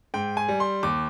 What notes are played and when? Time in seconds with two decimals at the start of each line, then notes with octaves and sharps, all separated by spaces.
0.14 G#2 G5
0.37 G#5
0.48 G3
0.60 C6
0.83 D#2 D6